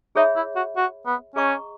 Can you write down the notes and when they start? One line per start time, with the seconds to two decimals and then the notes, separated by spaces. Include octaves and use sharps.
0.16 D#4 G#4 C#5 E5 B5
0.36 E4
0.56 F#4
0.76 F#4
1.06 B3
1.36 C#4 G#4 D#5 A#5 C#6